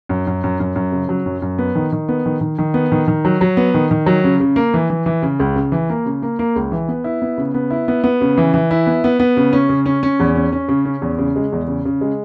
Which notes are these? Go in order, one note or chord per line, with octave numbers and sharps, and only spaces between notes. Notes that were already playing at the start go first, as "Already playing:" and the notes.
F#2
F#2
F#2
F#2
F#2
C#3
F#3
F#2
F#2
B3
D#3
D#3
B3
D#3
D#3
D#3
B3
D#3
D#3
F#3
F#3
B3
D#3
D#3
F#3
C#3
C#3
A#3
E3
E3
E3
C#3
C#2
C#3
E3
A#3
C#3
A#3
A#3
C#2
E3
B3
E4
B3
C#3
B3
E4
B3
B3
C#3
E3
E3
E4
B3
B3
B3
C#3
C#4
C#3
C#4
C#4
E2
C#4
C#4
C#3
C#4
E2
C#3
G#3
E2
C#3
C#3
G#3